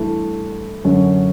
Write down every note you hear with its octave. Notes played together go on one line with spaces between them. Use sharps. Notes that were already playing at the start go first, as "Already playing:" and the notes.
Already playing: G2 E3 A3 E4 A4
F#2 D3 F#3 C#4